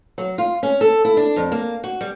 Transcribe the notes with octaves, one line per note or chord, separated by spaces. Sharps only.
F#3
F4
C#4
A4
E4
D4
F2
A#3
F#4
G3